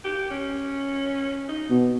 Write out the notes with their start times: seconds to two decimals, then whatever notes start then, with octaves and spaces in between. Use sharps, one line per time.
0.04 G4
0.30 C#4
1.48 D#4
1.70 B2